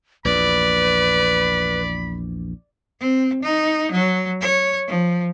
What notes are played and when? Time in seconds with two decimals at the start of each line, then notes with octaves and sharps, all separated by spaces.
0.25 A#1 E2 B4 D5 B5
3.00 C4
3.43 D#4
3.92 F#3
4.41 C#5
4.88 F3